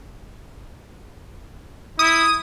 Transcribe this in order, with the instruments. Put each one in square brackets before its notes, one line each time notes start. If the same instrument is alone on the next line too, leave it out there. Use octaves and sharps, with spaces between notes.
[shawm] E4 [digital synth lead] D#6